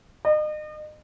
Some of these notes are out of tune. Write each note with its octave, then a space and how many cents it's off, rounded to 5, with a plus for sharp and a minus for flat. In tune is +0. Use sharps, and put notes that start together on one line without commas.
D#5 -40